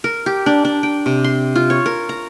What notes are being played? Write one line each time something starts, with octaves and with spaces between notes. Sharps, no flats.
A#4
G4
D4
D4
G5
C3
C6
F4
C#5
A#4
A#5